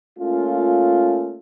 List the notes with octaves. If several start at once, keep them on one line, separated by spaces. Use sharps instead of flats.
A3 A#3 C#4 F4